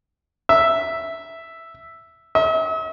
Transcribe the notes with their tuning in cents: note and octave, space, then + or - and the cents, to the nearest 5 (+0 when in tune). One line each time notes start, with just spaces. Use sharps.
E5 +0
E5 -45